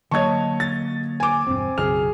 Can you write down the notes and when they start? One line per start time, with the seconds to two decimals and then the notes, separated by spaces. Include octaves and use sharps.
0.11 D3 F#3 A#3 C#5 D#5 A5 C#6 G#6
0.60 A6
1.20 G#5 D6
1.47 E1 G2 C4
1.78 B1 F#2 C#3 G#4 F6 F7